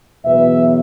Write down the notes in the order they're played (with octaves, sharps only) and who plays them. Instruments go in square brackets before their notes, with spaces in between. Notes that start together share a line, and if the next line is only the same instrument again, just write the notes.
[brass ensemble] E2 B2 F#3 B4 E5